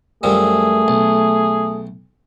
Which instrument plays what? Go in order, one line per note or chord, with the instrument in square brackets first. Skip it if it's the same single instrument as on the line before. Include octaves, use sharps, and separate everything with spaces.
[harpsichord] F#2 F3 G3 [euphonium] A3 [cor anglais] G#4
[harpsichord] B1